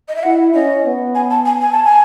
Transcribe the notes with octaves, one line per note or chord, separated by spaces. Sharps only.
D#5
E5
E4 F#5
C#4 D#5
B3
G#5
A5
G#5
G#5
A5
G#5